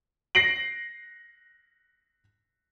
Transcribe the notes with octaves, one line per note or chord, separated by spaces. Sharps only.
A#6 C7 D7 F#7